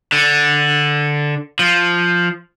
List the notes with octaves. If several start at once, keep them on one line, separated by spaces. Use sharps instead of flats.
D3
F3